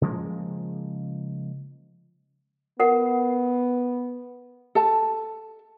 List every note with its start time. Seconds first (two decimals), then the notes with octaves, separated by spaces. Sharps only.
0.01 C#3 F3 G#3 A#3
2.80 B3 A#4 F#5
4.75 A4 A5